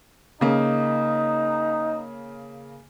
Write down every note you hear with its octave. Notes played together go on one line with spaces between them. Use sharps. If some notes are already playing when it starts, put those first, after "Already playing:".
C#3 A#3 D#4